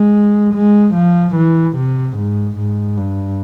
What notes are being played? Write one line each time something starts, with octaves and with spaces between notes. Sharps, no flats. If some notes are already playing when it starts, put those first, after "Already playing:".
Already playing: G#3
G#3
F3
E3
C3
G#2
G#2
G2